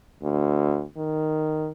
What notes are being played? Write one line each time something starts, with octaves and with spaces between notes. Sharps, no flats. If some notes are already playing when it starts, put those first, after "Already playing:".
D2
D#3